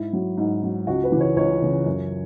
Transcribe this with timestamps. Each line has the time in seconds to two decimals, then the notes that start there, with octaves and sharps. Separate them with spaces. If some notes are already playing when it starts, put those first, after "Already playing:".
Already playing: G#2 E4
0.13 F#3
0.37 G#2
0.63 F#3
0.87 C#2 F#4
1.04 B4
1.12 C#3 E3
1.20 C#5
1.36 C#2 C#5
1.62 C#3 E3
1.86 F#2